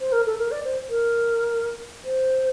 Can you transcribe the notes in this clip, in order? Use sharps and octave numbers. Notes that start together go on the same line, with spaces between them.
C5
A#4
A4
A#4
D5
C5
A#4
C5